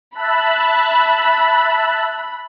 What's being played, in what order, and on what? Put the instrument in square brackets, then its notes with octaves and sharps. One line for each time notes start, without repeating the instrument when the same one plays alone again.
[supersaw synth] E5 A5 F#6 [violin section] B5